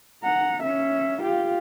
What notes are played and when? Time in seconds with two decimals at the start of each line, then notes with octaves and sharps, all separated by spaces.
0.23 F#5 A#5
0.63 C#4 E5
1.21 F4 G4